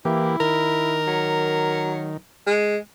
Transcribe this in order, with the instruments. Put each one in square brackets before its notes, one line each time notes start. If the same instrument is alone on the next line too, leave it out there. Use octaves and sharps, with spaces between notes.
[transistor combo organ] E3 A#3 G4 [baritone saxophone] E4
[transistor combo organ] D#3 [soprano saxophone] A#4
[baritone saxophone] F#3
G#3